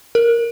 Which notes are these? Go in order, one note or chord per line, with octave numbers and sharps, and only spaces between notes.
A#4